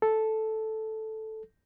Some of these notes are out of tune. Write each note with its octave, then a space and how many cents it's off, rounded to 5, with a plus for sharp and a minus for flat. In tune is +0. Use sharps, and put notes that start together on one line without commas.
A4 -5